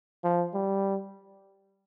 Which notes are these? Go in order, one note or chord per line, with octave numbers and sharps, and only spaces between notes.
F3
G3